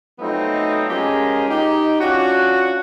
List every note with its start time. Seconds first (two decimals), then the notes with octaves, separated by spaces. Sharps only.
0.19 F3 F#3 A3 B3 C4 D#4
0.90 F3 G#3 C#4 G4 G#4 A#4
1.49 D#4 G4
1.99 C#4 D4 F4 F#4